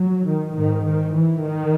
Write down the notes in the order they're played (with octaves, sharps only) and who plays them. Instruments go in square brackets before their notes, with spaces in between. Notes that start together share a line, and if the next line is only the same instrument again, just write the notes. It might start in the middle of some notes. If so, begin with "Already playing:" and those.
Already playing: [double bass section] F#3
D#3
G#2 D#3
D#3
E3
D#3